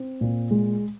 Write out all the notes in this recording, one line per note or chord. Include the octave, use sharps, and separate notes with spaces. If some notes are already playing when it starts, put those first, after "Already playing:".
Already playing: C4
A#2
G#3